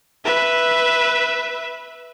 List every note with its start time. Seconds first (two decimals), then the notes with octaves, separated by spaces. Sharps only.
0.25 B4 E5